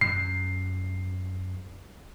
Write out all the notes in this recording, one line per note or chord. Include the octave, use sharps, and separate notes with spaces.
F#2 C7